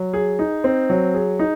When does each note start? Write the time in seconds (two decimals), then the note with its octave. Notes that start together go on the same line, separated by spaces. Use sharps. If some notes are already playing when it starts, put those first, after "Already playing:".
Already playing: F#3
0.14 G#4
0.39 D#4
0.64 C4
0.89 F#3
1.14 G#4
1.39 D#4